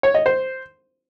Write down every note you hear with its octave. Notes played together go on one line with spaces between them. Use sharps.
C#5
D#5
C5